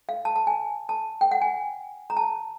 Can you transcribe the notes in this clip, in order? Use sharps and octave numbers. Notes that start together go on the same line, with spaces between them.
F5
A5
A5
G#5
A5
G5
F#5
G#5
A#5
A5